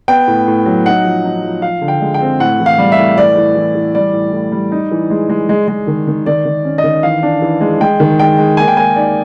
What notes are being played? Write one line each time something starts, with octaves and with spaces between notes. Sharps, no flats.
B3 G5
A2
A2
F#3
D#4 F#5
F3
D#4
F3
F3 F5
D3
G5
G#3
G5
C4
A2 F#5
E3
F5
G3
E5
A2
E3 D5
E3
E3
E3
G3 D5
A2
A2
G3
D#4
E3
G#3
G#3
G#3
G#3
D#3
D#3
D#3 D5
D#3
C#4
D#5
D#3
E3 F5
D4
E3
G#3
G#3 G5
D#3
G#3 G5
G#3
A#3 G#5
G5
A#3 G#5
D#4 D5